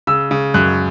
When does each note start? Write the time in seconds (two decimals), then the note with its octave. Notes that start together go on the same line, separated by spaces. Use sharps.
0.07 C#3 E6
0.31 C#3
0.54 F#2 F#6